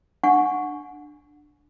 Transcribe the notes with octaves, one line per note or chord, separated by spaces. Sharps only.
D4 F#5 G#5 C#6